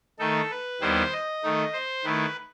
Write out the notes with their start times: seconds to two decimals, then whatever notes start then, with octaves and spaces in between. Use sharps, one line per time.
0.19 D#3 A3 D#4 A4
0.51 B4
0.81 D#2 D#3 G3 B3 E4 C5
1.12 D#5
1.43 D#3 A3 D#4
1.73 C5
2.04 D#3 A3 E4 B4